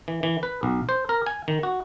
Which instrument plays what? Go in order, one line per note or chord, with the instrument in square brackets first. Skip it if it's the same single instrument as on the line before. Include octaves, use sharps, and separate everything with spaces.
[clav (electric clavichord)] E3
E3
B4
B1
C5
A#4
G#5
D#3
F#4